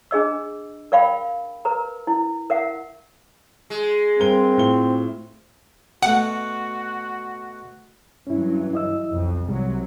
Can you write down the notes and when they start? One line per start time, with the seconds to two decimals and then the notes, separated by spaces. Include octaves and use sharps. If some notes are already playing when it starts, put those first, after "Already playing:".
0.11 D4 G#4 D#5 E6
0.92 A#4 D5 F5 G5 B5
1.65 A#4 B4 A#5
2.07 E4
2.50 A#4 E5 F#5
3.70 G#3
4.19 G2 C4 A#4 G7
4.57 A2 F4 G7
6.03 B2 A3 F#4 F#5
8.27 G2 E3 F#3 C#4 E4
8.73 E4 D#5 E6
9.11 B1 F2
9.49 C2 C3 F#3 G3